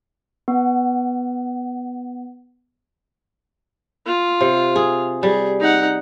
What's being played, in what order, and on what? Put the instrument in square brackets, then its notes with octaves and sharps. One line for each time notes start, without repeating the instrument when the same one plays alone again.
[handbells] B3 F#5
[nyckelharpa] F4
[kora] C3
G#4
[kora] G3 [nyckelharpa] G#4
[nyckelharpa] D#4 F#5